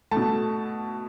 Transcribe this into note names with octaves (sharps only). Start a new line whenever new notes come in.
A3 A5
B2